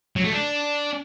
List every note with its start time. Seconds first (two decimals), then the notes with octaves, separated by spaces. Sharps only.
0.16 F#3
0.24 A3
0.32 D4